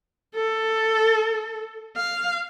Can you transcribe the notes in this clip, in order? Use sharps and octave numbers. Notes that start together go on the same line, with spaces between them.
A4
F5